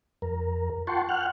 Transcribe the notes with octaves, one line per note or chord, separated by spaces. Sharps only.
F2 A#4
F4 F#5 G5 A5 C6 C#6
F#5 G5 F6 F#6